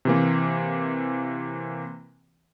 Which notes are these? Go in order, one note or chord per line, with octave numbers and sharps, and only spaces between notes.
C3 E3 A#3